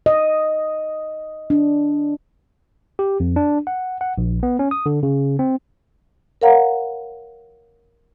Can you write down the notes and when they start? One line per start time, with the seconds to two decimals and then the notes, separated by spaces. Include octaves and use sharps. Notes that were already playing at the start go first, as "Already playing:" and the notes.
0.06 D#5
1.50 D4
2.99 G4
3.20 F2
3.36 D4
3.67 F#5
4.01 F#5
4.18 A#1
4.43 B3
4.59 C#4
4.71 D#6
4.86 D3
5.03 C#3
5.39 C4
6.41 A#4 C#5 F5 F#5 A#5